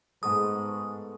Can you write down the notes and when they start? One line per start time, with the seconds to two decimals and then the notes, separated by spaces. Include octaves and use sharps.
0.23 G#2 G#3 A3 B3 D#6